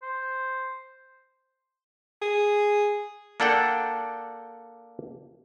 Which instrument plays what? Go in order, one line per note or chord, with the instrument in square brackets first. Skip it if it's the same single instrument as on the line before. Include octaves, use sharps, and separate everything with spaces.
[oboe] C5
[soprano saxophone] G#4
[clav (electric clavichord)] A#3 D4 A4 D5 F#5 G5